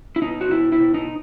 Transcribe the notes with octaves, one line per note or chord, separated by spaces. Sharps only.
E4
B2 D#4
F#4
B2 E4
E4
B2
D#4